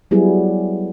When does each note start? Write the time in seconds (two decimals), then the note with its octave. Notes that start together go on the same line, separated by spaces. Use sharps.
0.11 F#3 G3 B3 E4 G#4